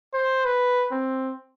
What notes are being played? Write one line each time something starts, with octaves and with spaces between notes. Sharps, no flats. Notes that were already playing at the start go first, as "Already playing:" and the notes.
C5
B4
C4